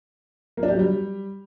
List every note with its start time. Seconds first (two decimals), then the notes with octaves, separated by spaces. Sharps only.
0.57 A#3
0.63 D4
0.68 G4
0.74 F#3
0.79 G3